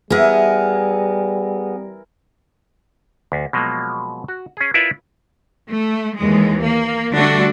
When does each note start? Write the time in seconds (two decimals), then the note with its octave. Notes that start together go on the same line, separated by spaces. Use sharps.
0.10 E3 G3 B3 G#4 A#4 E5
3.32 D2
3.53 B2 F3 F#3 G#3 A#3
4.28 F#4
4.57 C#4 G#4
4.74 E4 F4 A#4 B4 D5 E5
5.71 A3
6.17 D#2 E3 G#3
6.63 A#3
7.14 D3 G3 A3 D4 F#4